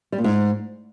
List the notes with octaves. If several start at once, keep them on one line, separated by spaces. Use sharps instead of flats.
G3
A#2
G#2